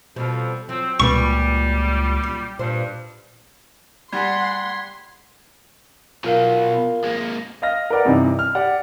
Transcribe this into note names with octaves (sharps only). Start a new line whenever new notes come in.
F2 B2 F3 G3
F3 F#3 C4
C#2 A#2 F#3 G3 B4 C#6
G2 A#2 C5
G3 F#5 G#5 C6 G#6 B6
B2 F#3 F4 A#4 F5
G#3 A#3
D#5 F5 F6 A#6
A#4 B4 D5 F#5
G2 C3 E3 D#4
F6
G4 D5 F#5